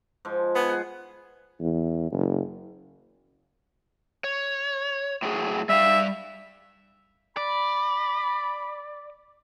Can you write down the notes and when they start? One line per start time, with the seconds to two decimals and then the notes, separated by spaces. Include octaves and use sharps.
0.25 G#2 F3
0.55 B3 G#4 G#5
0.69 F#5
1.60 E2
2.12 F#1
4.24 C#5
5.22 A2 F#3 G#4
5.69 G3 E5 F5
7.37 D5 B5